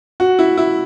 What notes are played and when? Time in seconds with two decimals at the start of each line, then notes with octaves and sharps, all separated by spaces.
0.20 F#4
0.39 E4
0.58 E4